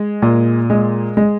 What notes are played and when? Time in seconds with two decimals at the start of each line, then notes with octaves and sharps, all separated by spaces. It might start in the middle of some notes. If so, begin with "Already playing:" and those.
Already playing: G#3
0.22 A#2
0.70 G#3
1.17 G#3